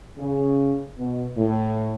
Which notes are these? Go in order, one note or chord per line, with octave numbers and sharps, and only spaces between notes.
C#3
B2
A2